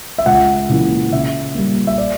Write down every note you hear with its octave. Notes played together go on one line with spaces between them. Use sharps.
E5
C#2 F#5
C#3 E3 A#3 E4
C#3 E5
G3 A#3
E5
D5